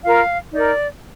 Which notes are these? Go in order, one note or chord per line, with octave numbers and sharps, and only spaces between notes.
F4 A#4 F5
D#4 A#4 D5